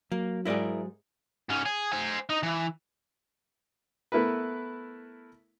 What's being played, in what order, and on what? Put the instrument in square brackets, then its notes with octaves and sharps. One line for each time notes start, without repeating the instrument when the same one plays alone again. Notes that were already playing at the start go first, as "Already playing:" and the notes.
[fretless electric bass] F#3 [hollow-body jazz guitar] A#3
[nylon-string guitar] G#2 A#3 G#4 [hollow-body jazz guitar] E4 A#4 D5
[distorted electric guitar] G#2 C#4
G#4
C5 G#5
D#4
E3
[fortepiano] A3 B3 E4 A#4 B4